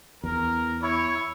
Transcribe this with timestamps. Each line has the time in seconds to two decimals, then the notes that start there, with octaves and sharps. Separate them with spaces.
0.24 E2 A#4
0.82 E4 C#5